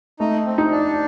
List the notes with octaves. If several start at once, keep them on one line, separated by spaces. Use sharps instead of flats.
A3 D#4
C4
D#4
D4